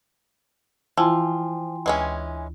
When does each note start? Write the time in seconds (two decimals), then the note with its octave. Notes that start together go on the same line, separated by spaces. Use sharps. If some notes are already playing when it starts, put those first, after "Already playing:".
0.97 E3 F3 E4 F4 G5 G#5 C6
1.86 D2 E3 G#3 C#4